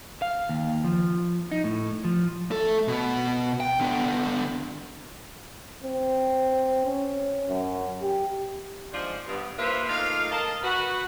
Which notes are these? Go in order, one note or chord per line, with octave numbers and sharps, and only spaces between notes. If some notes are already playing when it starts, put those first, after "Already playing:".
F5
D#2
F3
D#4
A2
F3
A3 A4
B2 B3
G5
D3 B3
C4
C#4
F#2
G4
G#2 F3 D4 C5
G2 B3
A#3 E4 F4 B4 C5
A3 A#3 D#4 F4 F5
A#4 D#5 F5 A5
F#4 B4